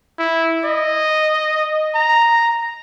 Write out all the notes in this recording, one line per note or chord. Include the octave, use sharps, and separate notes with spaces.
E4
D#5
A#5